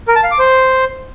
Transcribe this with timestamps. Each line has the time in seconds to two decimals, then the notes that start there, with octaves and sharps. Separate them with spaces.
0.08 A#4
0.16 A5
0.23 F5
0.31 D6
0.39 C5